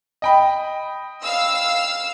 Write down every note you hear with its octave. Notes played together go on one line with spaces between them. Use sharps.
D#5 G5 B5
F5 E6